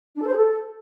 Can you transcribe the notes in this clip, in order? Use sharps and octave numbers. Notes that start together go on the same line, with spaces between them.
D4
A4
C5
G#4
A4